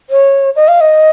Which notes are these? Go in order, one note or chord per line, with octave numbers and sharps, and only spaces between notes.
C#5
D#5
F5
D#5